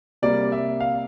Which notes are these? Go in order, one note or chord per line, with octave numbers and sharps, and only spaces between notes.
C3 G3 A#3 D5
E5
F5